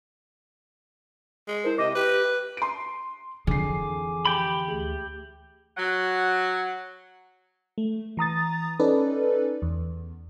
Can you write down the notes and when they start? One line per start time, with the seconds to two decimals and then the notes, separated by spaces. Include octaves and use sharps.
1.48 G#3
1.64 E4 A#4 C5
1.78 C3 D#5 D6 A#6
1.95 G4 B4
2.57 C6 D7
3.47 F2 D3 E3 G#4 G#5 D6 C7
4.25 G4 G5 B5
4.68 D2 A3 G#4
5.77 F#3 F#5
7.78 A3
8.17 E3 A#5 D#6 A6
8.79 C#4 D#4 A4 B4 D5
9.62 E2